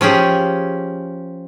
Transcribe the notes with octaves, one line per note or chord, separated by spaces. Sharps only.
F3 C#4 G4 G#4